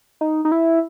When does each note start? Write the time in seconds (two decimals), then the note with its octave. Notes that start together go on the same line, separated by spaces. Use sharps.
0.21 D#4
0.45 D#4
0.52 E4